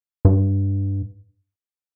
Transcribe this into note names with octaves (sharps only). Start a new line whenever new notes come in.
G2